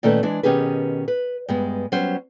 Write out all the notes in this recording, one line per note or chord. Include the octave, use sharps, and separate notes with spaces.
A#2 D#3 A3 C#4 A4 B4
E3 G#3 D4
B2 D#3 C#4 G4 G#4 B4
B4
G2 G#3 B3
F#3 G3 B3 C#4 C5